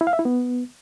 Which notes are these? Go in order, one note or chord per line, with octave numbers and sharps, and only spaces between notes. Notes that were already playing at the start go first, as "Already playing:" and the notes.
E4
F5
E5
E4
B3